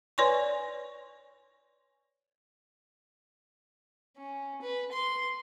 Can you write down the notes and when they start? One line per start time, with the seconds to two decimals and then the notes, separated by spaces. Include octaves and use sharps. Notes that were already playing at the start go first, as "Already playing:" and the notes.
0.18 B4 C#5 D5 G#5 C6 C#6
4.17 C#4
4.62 B4
4.92 C6